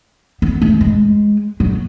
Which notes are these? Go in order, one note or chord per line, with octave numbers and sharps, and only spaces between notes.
B3
A3
G#3
F#3